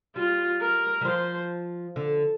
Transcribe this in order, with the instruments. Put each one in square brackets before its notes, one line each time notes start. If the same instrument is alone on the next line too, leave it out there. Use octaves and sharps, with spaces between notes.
[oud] G3 [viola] F4
[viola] A#4
[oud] G3
[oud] F3 [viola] C5
[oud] D3